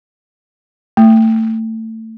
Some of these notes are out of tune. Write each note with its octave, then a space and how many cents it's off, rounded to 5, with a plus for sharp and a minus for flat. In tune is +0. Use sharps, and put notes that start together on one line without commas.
A3 +25